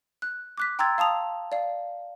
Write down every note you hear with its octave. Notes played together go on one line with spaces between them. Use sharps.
F#6
D6 F#6 B6
G5 A#5 C6 E6 G#6 A6
F5 A5 D#6 F7
D5 F5